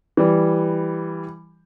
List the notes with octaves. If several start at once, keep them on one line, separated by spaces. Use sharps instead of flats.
E3 G3